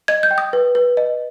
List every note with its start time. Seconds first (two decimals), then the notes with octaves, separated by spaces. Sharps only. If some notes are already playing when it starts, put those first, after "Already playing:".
0.08 D#5 G#6
0.23 G6
0.31 G5
0.38 D#6
0.53 B4
0.75 B4
0.97 D#5